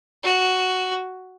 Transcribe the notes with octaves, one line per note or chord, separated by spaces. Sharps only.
F#4